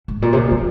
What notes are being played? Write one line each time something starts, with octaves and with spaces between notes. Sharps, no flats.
G#2
A#2
C3
A#2
F3